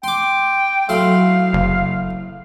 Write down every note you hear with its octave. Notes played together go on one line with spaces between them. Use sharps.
G5 C6 D6
A2 F#3 F5 C6
F#1